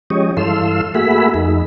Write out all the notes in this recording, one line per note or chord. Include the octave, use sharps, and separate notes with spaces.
F3 G#3 C#4 G4 C#5 D#5
G2 E3 A4 F5 C6 E6
A3 A#3 F#4 G#4 E5 B5
F2 D#4